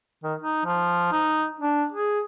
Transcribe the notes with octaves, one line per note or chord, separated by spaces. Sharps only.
D#3
D#4
F3
D#4
D4
G#4